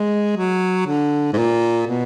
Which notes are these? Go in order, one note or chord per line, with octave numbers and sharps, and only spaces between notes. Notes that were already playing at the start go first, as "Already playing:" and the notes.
Already playing: G#3
F#3
D3
G#2
A#2
B2